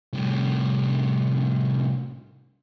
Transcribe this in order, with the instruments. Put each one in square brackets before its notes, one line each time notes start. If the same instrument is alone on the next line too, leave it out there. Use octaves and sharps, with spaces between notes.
[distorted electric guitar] C2 A2